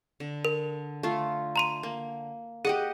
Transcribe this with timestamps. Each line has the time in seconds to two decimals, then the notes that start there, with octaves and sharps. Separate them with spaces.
0.20 D3
0.45 A#4
1.03 A3 F4
1.56 A#5 C6 D#7
1.83 A#3
2.65 G4 G#4 D#5 F#5